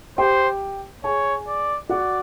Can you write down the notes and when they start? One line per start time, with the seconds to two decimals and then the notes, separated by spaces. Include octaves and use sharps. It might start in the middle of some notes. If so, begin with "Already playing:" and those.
0.18 G4 C5 G5
1.04 G#4 C#5 G#5
1.47 D5
1.89 F#4 D5 F#5